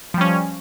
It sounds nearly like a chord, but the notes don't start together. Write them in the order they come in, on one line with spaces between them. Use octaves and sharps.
F3 G3 C#4